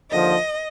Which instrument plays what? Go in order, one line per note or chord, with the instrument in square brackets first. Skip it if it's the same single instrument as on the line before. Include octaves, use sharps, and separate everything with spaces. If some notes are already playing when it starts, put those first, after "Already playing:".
[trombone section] D#2 D3 F3 [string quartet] D#5